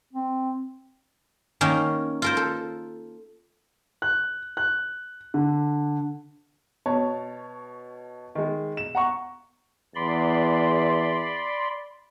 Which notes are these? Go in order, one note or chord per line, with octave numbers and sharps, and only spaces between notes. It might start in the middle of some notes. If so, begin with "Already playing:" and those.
C4
D#3 A#3 C#4 D#4
F4 A#4 C5
A4
F#6
F#6
D3
B2 C#5 A5
D#3 G#3
E7
F#5 A#5 C#6
E2 D5 B5 C6